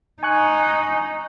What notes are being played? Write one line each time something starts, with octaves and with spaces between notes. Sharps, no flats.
D#4 G#5 C#6 F#6